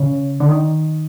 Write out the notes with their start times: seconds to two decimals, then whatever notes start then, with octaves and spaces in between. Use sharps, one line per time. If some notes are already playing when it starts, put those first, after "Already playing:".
Already playing: C#3
0.40 D3
0.49 D#3